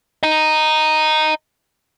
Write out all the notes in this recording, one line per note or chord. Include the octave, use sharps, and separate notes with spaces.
D#5 A#5